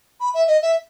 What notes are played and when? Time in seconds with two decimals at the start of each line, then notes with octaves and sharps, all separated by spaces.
0.20 B5
0.34 E5
0.47 D#5
0.62 E5